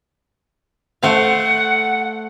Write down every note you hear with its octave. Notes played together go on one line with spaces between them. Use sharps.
A3 C5 F5 F#5